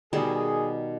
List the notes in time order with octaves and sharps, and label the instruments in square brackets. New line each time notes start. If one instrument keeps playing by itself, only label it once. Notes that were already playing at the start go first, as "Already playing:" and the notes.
[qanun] B2 D#3 G3 [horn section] G#4